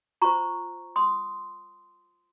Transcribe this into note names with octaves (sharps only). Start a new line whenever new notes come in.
F4 C5 A#5 C#6
C6 D#6